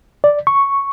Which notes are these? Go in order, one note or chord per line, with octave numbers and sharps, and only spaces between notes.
D5
C#6